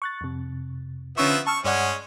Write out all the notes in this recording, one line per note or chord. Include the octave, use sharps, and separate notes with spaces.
C#6 F#6 A6
F2 C3
D3 F3 B3 C#4 E5 C#6
A5 C#6 E6 F6
G2 G#3 C#4 D5 F#5